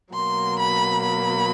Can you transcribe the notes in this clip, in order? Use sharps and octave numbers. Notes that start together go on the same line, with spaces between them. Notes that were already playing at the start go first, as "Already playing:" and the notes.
B2 F#3 A#3 C6
B5
B5